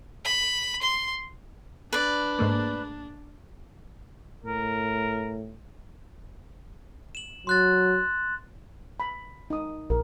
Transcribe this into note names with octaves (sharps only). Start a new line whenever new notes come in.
B5
C6
D4 B4 D5
G#2 A3 A#3
A2 A#4
E7 F#7
F#3 C6 F#6 A6
B5
D#4 D#6
A#1 A#4